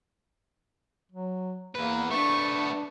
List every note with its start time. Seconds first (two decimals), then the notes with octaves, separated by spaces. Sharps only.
1.12 F#3
1.75 E2 A#3 B4
2.11 A3 B3 D4 C#6